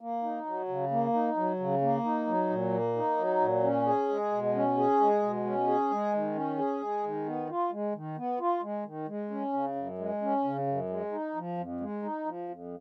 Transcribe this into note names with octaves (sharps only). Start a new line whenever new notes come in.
A#3
D#4
F#3
C#3
A#3
D#4
F#3
C#3
A#3
D#4
F#3
A#2
A#3
D#4
F#3
A#2
C#4
G#4
G#3
B2
C#4
G#4
G#3
B2
C#4
G#4
G#3
D#3
C#4
G#4
G#3
D#3
B3
F4
G#3
D#3
B3
F4
G#3
D#3
G#3
C#4
C#3
F#2
G#3
C#4
C#3
F#2
G#3
D#4
F3
F2
G#3
D#4
F3
F2